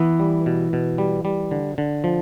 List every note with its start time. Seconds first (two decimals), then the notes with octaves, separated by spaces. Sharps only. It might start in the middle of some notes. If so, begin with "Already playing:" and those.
Already playing: E3 B3
0.19 G3
0.46 B2
0.73 B2
0.98 G3
1.25 G3
1.51 D3
1.78 D3
2.04 F3